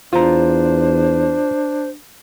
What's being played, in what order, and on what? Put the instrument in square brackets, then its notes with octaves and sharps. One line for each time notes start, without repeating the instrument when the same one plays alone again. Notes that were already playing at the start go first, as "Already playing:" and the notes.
[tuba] E2 [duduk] D4 [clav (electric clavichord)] F4 A#5 [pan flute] C5